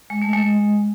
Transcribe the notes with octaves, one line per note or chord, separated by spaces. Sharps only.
G#3
A3
G#3